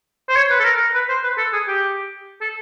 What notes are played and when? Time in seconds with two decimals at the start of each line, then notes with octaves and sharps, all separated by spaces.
0.29 C5
0.36 C#5
0.50 B4
0.60 A4
0.64 A#4
0.95 B4
1.09 C5
1.24 B4
1.38 A4
1.53 G#4
1.68 G4
2.41 A4